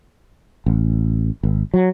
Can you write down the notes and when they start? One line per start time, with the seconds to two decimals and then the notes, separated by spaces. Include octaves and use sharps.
0.66 A1
1.43 G#1
1.74 F#3